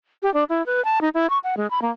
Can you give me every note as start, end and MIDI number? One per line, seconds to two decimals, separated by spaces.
0.23 0.32 67
0.34 0.44 62
0.49 0.65 64
0.66 0.83 71
0.85 0.99 81
1.01 1.09 63
1.14 1.29 64
1.30 1.39 85
1.44 1.55 78
1.57 1.70 56
1.70 1.80 83
1.82 1.91 58